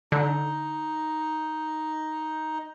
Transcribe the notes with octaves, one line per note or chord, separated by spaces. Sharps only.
D3 D#4